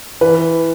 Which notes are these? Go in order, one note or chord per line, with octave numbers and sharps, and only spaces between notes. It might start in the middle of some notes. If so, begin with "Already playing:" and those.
E3 B4